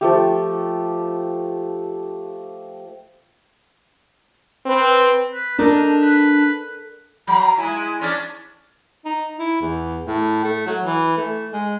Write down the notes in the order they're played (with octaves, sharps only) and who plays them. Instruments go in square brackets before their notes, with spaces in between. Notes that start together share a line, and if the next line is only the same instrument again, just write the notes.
[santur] F3 A3 G4
[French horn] C4 [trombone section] B4
[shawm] B4
[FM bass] D4 [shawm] D#4 [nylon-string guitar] A4 A#4 D5
[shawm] B4
[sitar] F#3 [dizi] B5
[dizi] A#5
[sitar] G#3 E4 [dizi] G#5
[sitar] C#4 D4 D5
[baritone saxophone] D#4
E4
E2
A2
A3
F#3
E3
A3
G#3